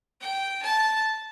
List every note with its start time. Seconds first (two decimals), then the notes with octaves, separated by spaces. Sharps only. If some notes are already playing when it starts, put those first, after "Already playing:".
0.21 G5
0.62 A5